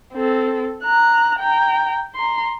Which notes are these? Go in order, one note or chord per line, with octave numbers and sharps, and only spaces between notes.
C4 A4
A#5 F#6
G5 A#5
A#5 C6